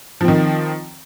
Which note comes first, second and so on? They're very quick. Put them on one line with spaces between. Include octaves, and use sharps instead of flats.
F3 C4 D#3